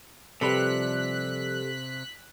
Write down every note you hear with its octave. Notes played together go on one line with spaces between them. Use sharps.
C3 F3 G3 G4 A4 B4 F#6 B6